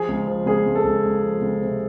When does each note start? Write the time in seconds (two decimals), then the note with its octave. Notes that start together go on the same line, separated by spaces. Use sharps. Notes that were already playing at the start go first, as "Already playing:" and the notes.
Already playing: F3 G#4
0.08 C#2
0.27 F3
0.46 C#2 G#4
0.66 C#2
0.75 A4
0.84 C#2
1.04 C#2
1.23 F3
1.41 C#2
1.61 C3